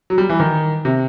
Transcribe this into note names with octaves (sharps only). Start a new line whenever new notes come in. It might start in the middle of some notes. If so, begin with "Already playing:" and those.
F#3
G3
E3
D#3
C3